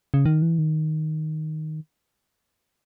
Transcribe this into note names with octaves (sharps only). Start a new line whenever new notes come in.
C#3
D#3
E3
D#3